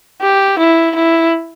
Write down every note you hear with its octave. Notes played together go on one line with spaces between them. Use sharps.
G4
E4
E4